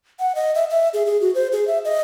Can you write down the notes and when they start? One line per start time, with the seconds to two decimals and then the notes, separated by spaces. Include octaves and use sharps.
0.19 F#5
0.35 D#5
0.55 E5
0.70 E5
0.94 G#4
1.06 G#4
1.21 F#4
1.35 C5
1.52 G#4
1.67 E5
1.85 D#5